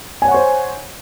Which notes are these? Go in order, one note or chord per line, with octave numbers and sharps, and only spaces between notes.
C5 C#5 F#5 G#5 C#6